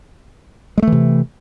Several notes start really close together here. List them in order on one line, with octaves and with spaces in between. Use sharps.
G#3 A3 E3 C3